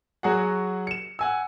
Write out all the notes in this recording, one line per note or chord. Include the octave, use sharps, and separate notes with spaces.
F#3 F#4 G#4 F#5
C#7 E7
F#5 G#5 E6